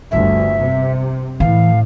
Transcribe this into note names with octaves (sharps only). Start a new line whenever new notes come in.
G1 D2 E5
C3
A2 E3 F5